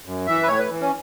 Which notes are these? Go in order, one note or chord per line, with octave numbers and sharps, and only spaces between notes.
F#2
E3 E5
B4
A2 C#5
B4
E3
C#4